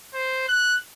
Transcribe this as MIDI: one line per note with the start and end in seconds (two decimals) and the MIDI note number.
0.14 0.47 72
0.49 0.76 90